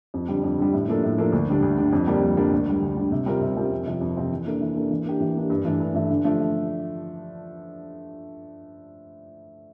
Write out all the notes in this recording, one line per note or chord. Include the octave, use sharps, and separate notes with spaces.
F2
D3 G3
F2
D3 G3
A2
F3 A#3 D4 A4
A2
F3 A#3 D4 A4
D2
D3 G3 D4
D2
D3 G3 D4
F2
D3 G3 A#3 D4
F2
D3 G3 A#3 D4
D2
D3 G3
D2
D3 G3
C3
G3 C4 F4 A#4
C3
G3 C4 F4 A#4
F2
C3 F3 C4 F4
F2
C3 F3 C4 F4
E3
A#3 D4 A4
E3
A#3 D4 A4
E3
A#3 D4 G4
E3
A#3 D4 G4
G2
E3 A3 D4
G2
E3 A3 D4
D3
F3 A3 D4